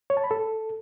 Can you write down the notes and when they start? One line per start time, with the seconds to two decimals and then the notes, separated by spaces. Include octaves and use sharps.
0.10 C#5
0.17 A5
0.24 B5
0.31 A4